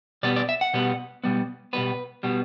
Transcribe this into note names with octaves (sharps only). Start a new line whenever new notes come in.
B2 G3 B3 D5
D5
E5
F#5
B2 G3 B3
B2 G3 B3
B2 G3 B3 B4
B2 G3 B3